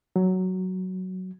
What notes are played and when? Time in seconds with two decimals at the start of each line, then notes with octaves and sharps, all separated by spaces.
0.16 F#3